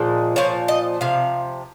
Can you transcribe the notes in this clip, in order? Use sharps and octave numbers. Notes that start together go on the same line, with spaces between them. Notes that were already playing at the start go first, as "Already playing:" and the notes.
Already playing: A#2 F3 G#3
A#2 F3 C#5
D#5
C3 F3 F5